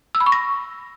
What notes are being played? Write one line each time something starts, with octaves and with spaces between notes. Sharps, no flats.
E6
B5
C#6
A#6